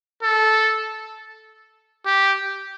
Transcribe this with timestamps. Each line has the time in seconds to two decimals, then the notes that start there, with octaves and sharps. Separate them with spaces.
0.22 A4
2.06 G4